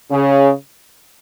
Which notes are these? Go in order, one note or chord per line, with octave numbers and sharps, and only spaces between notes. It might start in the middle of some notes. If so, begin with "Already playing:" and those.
C#3